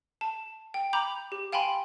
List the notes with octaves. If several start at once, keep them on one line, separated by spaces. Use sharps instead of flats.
A5
G5
A#5 B5 D6 G6 F7
G4
F5 G5 G#5 B5 C6